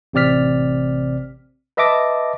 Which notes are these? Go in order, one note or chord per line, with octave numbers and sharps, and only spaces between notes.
A1 C3 C4 D5 F6 B6
B4 D#5 E5 A5 D6 A#6